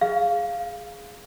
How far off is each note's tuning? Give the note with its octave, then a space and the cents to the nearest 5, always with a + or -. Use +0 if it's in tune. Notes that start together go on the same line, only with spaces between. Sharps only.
G#4 +0 F5 +0